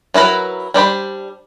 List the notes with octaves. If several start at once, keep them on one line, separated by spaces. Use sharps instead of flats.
F#3 E4 A#4 B4
G3 D4 C5 B5